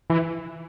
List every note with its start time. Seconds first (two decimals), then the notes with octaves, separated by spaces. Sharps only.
0.10 E3